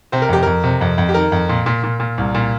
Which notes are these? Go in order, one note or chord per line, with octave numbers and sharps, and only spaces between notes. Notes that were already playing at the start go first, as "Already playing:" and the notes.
C3 C5
A#4
F2 G4
F2 A#4
C3
F2
F2
G4
D#3 A#4
F2
A#2
A#2
A#2
A#2
C2
A#2